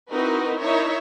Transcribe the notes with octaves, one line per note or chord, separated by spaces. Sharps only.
C4 D#4 E4 F#4 A#4 B4
D#4 E4 A#4 C#5 E5